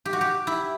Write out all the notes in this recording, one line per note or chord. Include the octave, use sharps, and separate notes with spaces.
G4
F#4
G4
E4